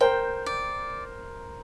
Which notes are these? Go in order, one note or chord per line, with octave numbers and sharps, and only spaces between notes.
A#4 C5 G5
D5